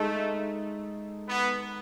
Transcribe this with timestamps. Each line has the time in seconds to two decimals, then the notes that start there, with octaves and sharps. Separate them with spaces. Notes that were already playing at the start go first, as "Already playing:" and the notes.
Already playing: G#3 A3 D#4 A4
1.27 B3